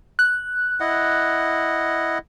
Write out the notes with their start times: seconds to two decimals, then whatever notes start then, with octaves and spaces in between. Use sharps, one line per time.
0.19 F#6
0.80 E4 D#5 F#5